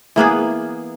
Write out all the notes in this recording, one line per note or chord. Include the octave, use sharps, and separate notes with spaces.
E3 A#3 B3 G#4